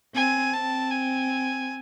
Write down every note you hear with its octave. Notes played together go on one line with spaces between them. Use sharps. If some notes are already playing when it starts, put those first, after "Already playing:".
C4 G#5
C4 A5
G#5